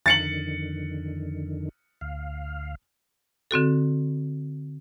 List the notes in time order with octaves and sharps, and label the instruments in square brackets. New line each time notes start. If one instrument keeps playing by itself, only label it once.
[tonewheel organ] F2 D3 D#3 [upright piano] A6 C#7 F#7
[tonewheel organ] D2 F5
[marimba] D3 C4 F#4 A4